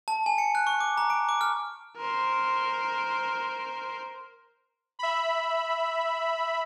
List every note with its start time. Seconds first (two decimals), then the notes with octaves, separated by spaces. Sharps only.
0.08 A5
0.26 G#5
0.38 C#7
0.55 F#6
0.67 C#6
0.80 D6
0.97 A#5
1.10 D7
1.29 D6
1.41 F6
1.97 A#4 C5
4.99 E5 B5